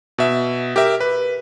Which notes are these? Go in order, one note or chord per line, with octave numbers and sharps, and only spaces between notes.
B2 E5
G4 A#4 E5
B4